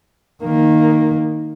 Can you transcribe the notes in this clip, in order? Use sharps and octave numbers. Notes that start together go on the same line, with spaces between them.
D#3 A#3